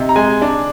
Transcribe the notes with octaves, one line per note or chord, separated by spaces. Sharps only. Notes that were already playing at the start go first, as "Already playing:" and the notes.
Already playing: C3 D#4
A#5
G#3 G#5
D4